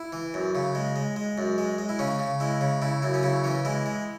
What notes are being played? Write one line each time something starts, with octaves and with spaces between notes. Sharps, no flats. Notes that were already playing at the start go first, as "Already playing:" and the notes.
Already playing: E4
E3
F#2
C#3
G#3
G#3
G#3
F#2
G#3
G#3
E4
C#3 C#4
C#3
G#3 E4
C#3
C#3 E4
F#2 E4
C#4
C#3 E4
E3 C#4
G#3 E4
G#3